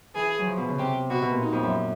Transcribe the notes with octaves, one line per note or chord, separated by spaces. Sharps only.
E3 G#4
F#3
F3
B2
C#3
C3 G4
B2 F#4
B2
A#2
D#4
F2
F#2